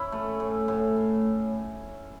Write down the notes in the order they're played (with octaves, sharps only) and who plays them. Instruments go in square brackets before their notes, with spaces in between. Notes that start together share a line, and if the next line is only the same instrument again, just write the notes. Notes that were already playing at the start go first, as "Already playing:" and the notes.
Already playing: [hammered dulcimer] C#4 E4
A3
A2
A2
A2